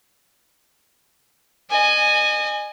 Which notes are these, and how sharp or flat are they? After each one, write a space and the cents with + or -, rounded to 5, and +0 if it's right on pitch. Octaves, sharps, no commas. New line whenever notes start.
D#5 -35 G#5 +0